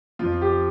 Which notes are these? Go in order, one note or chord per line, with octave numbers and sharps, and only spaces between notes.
F2 F3 F4
G4